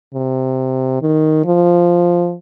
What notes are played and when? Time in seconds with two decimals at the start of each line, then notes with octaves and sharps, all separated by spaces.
0.14 C3
1.02 D#3
1.45 F3